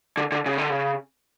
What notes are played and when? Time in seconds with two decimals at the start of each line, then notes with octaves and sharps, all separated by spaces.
0.17 D3
0.32 D3
0.46 C#3
0.58 D3
0.70 C#3